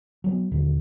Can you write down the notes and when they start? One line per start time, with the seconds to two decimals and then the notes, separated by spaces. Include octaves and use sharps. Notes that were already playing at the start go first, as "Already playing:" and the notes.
0.24 F#3 A#3 B3
0.52 D#2 A#2 D3